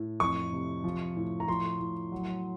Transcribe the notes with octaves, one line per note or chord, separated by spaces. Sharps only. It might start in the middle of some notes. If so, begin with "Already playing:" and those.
Already playing: A2
F2 C#6
C3
F3
A2
A#5
F3 C6
A2
F#3